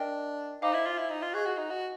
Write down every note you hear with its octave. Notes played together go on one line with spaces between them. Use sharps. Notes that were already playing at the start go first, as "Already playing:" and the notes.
Already playing: D4 A#4 D#5 G5
D#4 C5 F5 G#5 B5 D6
E4
F4
E4
D#4
F4
G#4 D#5 G#5 C#6 F#6
F#4
D#4
F#4